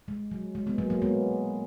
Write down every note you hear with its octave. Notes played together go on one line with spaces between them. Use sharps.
G#3
F#3
G#3
G#3 B3
F#3 A#3
F#3 A#3
G#3 B3